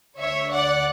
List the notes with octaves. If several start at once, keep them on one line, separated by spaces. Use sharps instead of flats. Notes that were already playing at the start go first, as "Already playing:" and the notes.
D2 D3 C#5 E5
D5 F#5